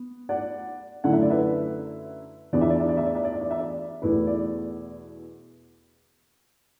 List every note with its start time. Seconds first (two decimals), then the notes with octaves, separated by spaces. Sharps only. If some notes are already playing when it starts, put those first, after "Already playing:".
Already playing: B3
0.29 D5 F#5
1.04 F#2 D3 A3 E4 F#5
1.13 E5
1.22 D5
1.30 B4 E5
2.53 E2 E3 B3 D4 D5
2.61 E5
2.70 D5
2.80 E5
2.89 D5
2.97 E5
3.06 D5
3.15 E5
3.25 D5
3.33 E5
3.41 D5
3.51 E5
3.60 D5
4.02 E2 B2 A3 E4 B4
4.27 D5